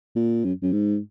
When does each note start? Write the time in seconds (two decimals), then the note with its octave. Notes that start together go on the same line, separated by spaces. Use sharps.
0.16 A#2
0.44 F#2
0.62 F#2
0.72 G#2